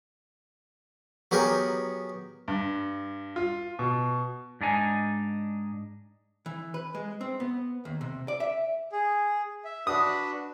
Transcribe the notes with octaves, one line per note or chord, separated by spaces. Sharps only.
F#3 B3 G4 G#4 A#4
G2
F4
B2
G#2 D4 D#4 G#5
E3
B4
G#3
C4
B3
D#2
C3
D5
E5
G#4
E5
D4 F#4 B4 D#6